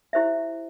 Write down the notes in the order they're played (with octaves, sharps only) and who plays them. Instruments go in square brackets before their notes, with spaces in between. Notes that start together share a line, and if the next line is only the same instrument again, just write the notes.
[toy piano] E4 G4 C5 E5